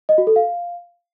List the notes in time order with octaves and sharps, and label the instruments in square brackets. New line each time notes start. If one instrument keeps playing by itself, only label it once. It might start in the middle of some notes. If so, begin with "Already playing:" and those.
[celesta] D#5
F#4
A4
F5